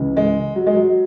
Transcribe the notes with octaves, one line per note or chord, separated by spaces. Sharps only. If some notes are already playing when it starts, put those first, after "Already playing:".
Already playing: C#2 C#3 E3
G#3
F#3
G#3
F#3